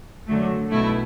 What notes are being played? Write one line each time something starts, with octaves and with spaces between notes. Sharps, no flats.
F#2 D3 F#3 A3
B1 B2 A3 E4